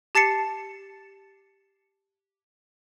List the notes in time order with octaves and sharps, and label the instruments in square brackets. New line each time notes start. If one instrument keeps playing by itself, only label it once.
[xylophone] G4 A5 A6 C7 C#7